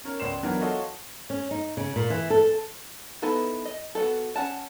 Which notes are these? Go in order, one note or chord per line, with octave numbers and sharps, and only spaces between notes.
C#4 A#4 C#5
C#2 D5 C6 C7 E7
E3 F#3 B3 D4 A#4
F4 F#4 A4 C#5 D#5 F5
C#4
D#4
C#3
A#2
E3
A4
B3 D#4 E4 A4 B4
D#5
B3 F#4 A4
C#4 F#5 A5